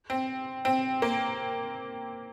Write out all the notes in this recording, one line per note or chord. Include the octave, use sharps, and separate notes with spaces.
C4
C4
A#3